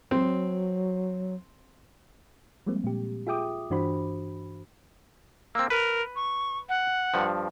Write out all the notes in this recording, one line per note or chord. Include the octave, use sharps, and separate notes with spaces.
F#3 C4
F3 G3 G#3 A#3 C4
A#2 G4
F4 G#4 E5 G5 D6 D#6
G2 E3 D4 F#4 C5 B5
A#3 C4 E6
A#4 B4
C#6
F#5
G2 F3